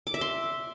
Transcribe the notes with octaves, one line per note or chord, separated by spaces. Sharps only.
D6
E5
C6